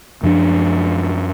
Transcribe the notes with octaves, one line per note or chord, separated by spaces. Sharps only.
F#2 F3 B3 D4